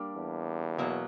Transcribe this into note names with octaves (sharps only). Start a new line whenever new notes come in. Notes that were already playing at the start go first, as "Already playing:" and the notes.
Already playing: G3 A#3 D4 G4
E2
B2 F#3 A#3